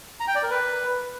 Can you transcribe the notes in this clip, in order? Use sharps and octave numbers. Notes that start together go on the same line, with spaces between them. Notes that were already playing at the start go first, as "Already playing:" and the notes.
A#5
G5
D5
A#4
B4